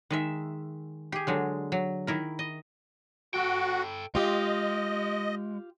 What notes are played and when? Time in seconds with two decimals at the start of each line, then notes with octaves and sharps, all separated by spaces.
0.10 D#3 G#3 E5
1.12 G4 G#4
1.27 D3 F#3 G#3
1.72 F#3
2.07 D#3 E4 A#4
2.39 D#5
3.34 F#4 A4 G5
4.15 G#3 F4 G4 D#5